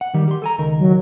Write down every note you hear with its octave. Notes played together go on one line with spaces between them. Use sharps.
F#5
D#3 G3
G4 C6
A4 G#5 A#5
C#2 D#3 A#4
F#3